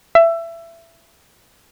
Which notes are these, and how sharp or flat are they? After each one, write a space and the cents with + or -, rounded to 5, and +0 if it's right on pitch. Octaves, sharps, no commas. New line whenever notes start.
E5 +20